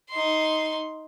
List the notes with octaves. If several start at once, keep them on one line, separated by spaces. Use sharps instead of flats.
D#4 C6